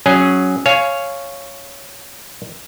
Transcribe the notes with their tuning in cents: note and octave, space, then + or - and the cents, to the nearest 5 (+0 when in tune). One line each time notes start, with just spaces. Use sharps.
F#3 +0 C#4 +0 G#4 +0
C#5 +0 F5 -10 G#5 +15